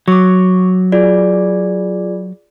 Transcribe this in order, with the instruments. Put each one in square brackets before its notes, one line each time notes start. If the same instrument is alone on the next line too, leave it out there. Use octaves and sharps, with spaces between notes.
[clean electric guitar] F#3 [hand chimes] C#6 D6
[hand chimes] F4 G#4 D5